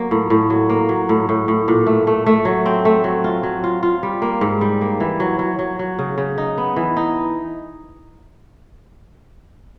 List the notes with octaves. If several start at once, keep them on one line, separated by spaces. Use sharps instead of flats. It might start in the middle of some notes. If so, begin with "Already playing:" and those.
Already playing: F#3 A#3
A2
A2
F#3
A#3
F#3
A2
A2
A2
A#2
A3
A3
A3
F#3
C4
A3
F#3
F4
F#3
F4
F4
G3
A#3
G#2
G3
A#3
E3
F#3
F#3
F#3
F#3
C#3
C#3
D#4
B3
E3
D#4